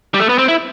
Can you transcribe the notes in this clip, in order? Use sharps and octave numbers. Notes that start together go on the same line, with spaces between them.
G3
A3
B3
C4
E4